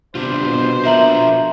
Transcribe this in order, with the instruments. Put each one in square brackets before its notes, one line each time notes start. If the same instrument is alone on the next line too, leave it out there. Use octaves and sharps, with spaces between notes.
[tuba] C3 [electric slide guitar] B3 D4 F4 [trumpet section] C5
[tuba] B2
[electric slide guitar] D4 F4 A#4 [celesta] E5 A#5 F#7